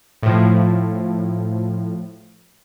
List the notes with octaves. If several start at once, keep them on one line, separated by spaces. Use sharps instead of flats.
A2 F3